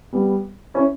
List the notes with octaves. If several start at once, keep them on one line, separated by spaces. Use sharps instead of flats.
G3 B3
C#4 E4